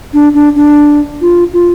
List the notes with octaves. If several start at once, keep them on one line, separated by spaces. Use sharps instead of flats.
D4
D4
D4
F4
F4